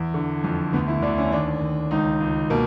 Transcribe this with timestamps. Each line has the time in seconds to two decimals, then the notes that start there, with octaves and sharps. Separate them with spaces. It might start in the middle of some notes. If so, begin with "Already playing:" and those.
Already playing: E2
0.14 D3
0.44 F2
0.72 D2 B3
0.88 E4
1.02 D2 D4
1.18 C#4
1.32 D#2 D4
1.61 D#2
1.91 C#2 D#4
2.20 C#2
2.50 B2 A#3